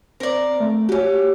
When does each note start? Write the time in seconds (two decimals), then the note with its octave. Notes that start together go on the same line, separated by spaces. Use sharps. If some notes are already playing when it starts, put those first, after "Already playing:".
0.20 C4 A#4 D5
0.60 A3
0.89 C#4 F#4 G4